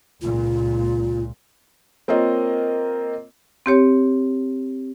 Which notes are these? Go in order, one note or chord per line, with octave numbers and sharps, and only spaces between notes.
C#2 A#2 F4
A#3 C4 F4 C#5 D#5
C4 G4 C#5